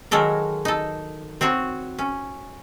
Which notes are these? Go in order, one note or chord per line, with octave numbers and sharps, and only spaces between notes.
D#3 F#3 G#3 A4 A#4
D#4 A4
C4 F#4 C#5 A#5
C#4